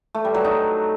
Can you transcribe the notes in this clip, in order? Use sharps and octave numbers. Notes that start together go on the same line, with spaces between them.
A3
G3
F#3
D#4